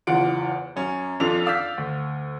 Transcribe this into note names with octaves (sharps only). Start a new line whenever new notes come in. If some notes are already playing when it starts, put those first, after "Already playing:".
F#1 E2 F4 F#5 D7
F#2 C#4
F2 D4 F4 A4 F7
D5 F5 E6 F6 G6 B6
D2